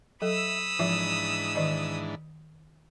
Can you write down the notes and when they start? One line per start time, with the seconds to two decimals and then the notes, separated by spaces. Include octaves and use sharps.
0.22 F#3 A4 E5 B5 D#6 E6
0.79 G#2 E3 F3 D4 F4 E5
1.55 D#3 D5 D#5